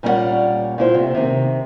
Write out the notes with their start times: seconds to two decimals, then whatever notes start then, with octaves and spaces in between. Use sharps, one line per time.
0.03 A#2 G3 C#4 E4 D5 F#5
0.78 A#2 E4 C5
0.94 C3 A3
1.14 C3 D#3 C4